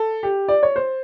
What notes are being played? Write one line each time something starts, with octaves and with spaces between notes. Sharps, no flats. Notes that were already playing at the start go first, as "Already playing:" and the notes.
Already playing: A4
G4
D5
C#5
C5